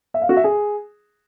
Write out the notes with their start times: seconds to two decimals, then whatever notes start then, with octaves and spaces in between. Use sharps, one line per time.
0.14 E5
0.22 F5
0.29 F#4
0.37 E5
0.44 G#4